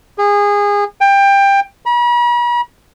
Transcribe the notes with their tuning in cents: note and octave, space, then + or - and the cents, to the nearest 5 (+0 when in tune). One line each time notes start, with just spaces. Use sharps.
G#4 -25
G5 +20
B5 -45